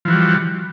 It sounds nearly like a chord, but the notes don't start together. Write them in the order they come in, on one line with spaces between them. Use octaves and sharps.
F3 E3 F#4 G3